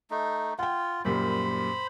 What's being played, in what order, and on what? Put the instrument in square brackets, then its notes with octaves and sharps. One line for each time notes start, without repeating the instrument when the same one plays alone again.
[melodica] A3 D#4
[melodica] F4 [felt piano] F#5 G5
[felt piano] F#2 A#2 G3 [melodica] C5 B5